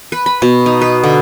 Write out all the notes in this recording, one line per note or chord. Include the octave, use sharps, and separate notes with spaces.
B4
B5
B2
D#4
B4
D3